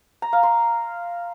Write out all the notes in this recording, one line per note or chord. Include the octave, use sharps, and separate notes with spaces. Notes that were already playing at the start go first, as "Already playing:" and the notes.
A#5
F5
C6